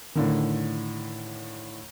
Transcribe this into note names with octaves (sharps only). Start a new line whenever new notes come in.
A2 D3 D#3